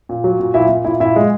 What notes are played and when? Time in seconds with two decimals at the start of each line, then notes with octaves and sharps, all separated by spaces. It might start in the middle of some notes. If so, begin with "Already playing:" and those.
0.09 A#2
0.24 F#3
0.40 A#2
0.54 A#2 E4 E5
0.69 A#2
0.85 A#2 E4 E5
1.00 A#2 E4 E5
1.16 G#3